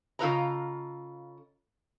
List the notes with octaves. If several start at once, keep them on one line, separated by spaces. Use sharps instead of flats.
C#3 F4 A4 B4 D#5 A#5